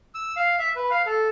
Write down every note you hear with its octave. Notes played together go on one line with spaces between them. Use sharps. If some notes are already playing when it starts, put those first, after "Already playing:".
E6
F5
E5
B4
F5
A4